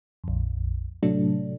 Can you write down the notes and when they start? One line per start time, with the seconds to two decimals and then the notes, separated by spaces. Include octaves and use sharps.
0.24 A#1 F2
1.03 A2 C3 F#3 A3 D4